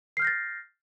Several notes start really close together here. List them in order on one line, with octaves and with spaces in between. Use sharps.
C7 F6 G6 A#6 A6